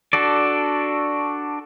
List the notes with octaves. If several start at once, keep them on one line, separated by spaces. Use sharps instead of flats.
D4 F#4 A4 D5